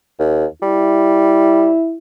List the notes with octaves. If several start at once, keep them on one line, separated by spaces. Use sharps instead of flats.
D#2
G3 E4